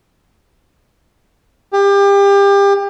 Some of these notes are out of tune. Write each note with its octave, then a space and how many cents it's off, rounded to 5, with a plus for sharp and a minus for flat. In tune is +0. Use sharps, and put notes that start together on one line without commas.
G4 +30